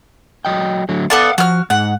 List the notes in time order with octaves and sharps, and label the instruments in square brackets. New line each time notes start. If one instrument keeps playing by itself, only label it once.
[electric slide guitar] F#3 D#5 G5
D3 F#3 A3
[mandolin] B3 A4 D5 [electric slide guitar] F5 F#5
[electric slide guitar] F3 [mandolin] F#4 F6
[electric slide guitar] G#2 [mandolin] F#5